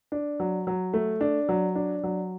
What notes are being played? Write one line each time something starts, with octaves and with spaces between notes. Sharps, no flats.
D4
F#3
F#3
A3
D4
F#3
D4
F#3